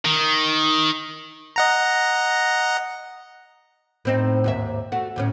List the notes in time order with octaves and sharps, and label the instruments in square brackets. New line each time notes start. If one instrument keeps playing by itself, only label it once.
[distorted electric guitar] D#3
[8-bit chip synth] D#5 F#5 A#5
[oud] A2 C4 D#4
D#2 G#2 E5
A3 F#4
D2 A2 C#4